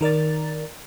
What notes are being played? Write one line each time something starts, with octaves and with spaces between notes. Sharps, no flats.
D#3 A#4 D5 A6